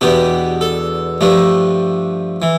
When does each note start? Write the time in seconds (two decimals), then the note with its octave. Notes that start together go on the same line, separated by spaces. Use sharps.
0.01 E2 B2 B3 D4 G4
0.61 A4
1.21 G2 F3 A3 D4
2.42 E3